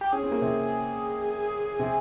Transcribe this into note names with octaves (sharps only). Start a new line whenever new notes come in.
G4
C#4 G#4
C4
A#3
C3 C4
C3 C4